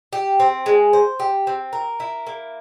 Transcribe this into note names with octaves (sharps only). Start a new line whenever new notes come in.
G4
C4
G#3
C5
G4
C4
A#4
E4
A#3